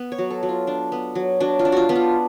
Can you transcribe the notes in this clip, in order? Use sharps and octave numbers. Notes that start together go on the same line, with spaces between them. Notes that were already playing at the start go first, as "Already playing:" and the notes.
Already playing: B3
C#5
F#3
A4
F#3
F4
D4
B3
F#3
F#3 D4
F4
D4
F4 F#4
B3 D4
F4